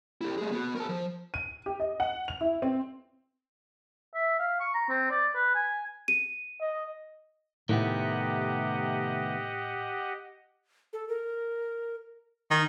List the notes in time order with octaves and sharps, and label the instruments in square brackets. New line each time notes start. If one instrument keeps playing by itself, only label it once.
[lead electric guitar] E4 G4
A3 G#4
B3 F#4
A#4 A5
F3
[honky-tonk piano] D#7
G4
D#5
F#5
F7
E4
C4
[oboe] E5
F5
C#6
A#5
C4
D5
B4
G#5
[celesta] D#7
[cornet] D#5
[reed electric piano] A2 [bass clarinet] C3 [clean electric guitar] D#3 A3 B3 [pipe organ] G4 D#5 F#5
[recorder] A4
A#4
[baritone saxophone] D#3 [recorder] D#4